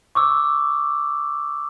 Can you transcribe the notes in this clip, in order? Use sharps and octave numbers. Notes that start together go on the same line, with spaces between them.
C#6 D6 E6